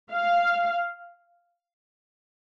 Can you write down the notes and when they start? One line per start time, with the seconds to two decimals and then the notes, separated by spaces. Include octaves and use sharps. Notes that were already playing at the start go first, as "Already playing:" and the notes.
0.12 F5